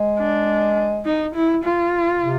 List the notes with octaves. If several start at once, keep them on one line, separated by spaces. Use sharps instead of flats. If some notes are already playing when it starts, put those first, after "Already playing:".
Already playing: G#3
D4
D#4
E4
F4
C3